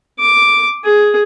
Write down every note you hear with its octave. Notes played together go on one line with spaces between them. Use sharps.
D6
G#4